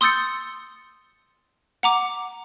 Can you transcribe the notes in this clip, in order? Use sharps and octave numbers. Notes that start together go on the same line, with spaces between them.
C6 D#6 E6 G6 A6 C#7
F#5 A#5 D6